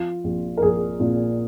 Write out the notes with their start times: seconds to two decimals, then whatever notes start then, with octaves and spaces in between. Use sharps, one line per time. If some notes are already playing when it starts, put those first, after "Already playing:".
Already playing: F3 F4
0.24 A#1
0.57 A#4
0.62 A#1 G#4
1.00 A#2